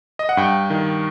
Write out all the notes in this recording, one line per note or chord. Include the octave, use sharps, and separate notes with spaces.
D#5
F#5
G2 G5
D#3